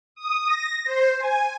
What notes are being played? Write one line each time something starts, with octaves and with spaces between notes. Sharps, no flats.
D#6
A#6
C5
G#5